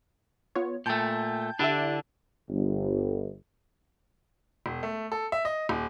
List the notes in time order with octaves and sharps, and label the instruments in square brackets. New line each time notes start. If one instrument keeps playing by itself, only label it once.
[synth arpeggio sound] B3 F4 C#5
[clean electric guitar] A#2 A3 [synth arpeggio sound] G5 A5 G6
[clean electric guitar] D3 D4 [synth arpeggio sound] E4 G4 E5
[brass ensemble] G1
[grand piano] E1
A3
A4
E5
D#5
D#1